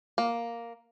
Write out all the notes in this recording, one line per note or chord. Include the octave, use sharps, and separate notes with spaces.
A#3